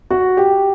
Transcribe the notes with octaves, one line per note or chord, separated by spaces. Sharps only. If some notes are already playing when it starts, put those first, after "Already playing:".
F#4
G4